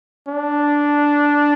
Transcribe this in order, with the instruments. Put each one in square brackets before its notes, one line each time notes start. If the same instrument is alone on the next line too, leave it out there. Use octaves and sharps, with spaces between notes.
[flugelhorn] D4